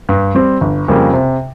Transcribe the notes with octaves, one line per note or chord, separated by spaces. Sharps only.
G2
G3 C4
G1
F2 C#3 G3 A#3
C3